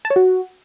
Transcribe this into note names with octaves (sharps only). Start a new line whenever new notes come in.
A5
C#5
F#4